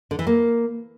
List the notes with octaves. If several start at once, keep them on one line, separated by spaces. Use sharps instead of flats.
D3
E3
A#3